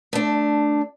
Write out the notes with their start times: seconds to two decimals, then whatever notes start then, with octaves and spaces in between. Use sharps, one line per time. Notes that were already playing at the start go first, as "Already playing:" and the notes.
0.13 A3 D4